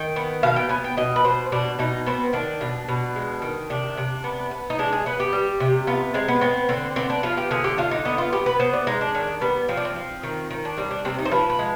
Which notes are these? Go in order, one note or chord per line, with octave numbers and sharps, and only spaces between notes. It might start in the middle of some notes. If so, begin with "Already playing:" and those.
Already playing: D#3 G5
B3
B2 F5
G5
B3 G#5
G5
B2 D#5
B4
B2 C5
B2 D4
B2 D#4
B3 C4
D#3 D4
B2
B2
G#3
D#3
C3 D4
C3
B3
B3
D#4
G#3 D4
G#4
B3 B4
G4
G3
C3
B3 F4
G#3 C4
B3
B3 C4
D3 C4
B3 C4
D4
F3 F4
G4
D3 G#4
G4
D3 F4
D#4
B3 D#4
F4
B3 G4
B4
B3 C5
D5
G#3 D#4
D4
D#3 D4
G3 B3
F3 C4
D4
C4
F3
D#3
D#3
D4
G3 C4
D4
C3 C4
D#4
C5
F3 B4
B4
G#3